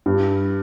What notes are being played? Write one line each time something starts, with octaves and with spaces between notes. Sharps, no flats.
G2